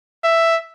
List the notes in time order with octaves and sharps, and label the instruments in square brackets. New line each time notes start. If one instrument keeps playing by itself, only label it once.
[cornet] E5